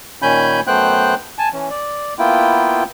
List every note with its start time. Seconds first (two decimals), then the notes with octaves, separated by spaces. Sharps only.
0.22 A#2 D#3 C#4 G#5 B5 G6
0.67 F#2 A3 B3 C5 G5 F#6
1.39 G#5 A5
1.53 E3 C#4
1.70 D5
2.19 A#3 B3 E4 F4 G5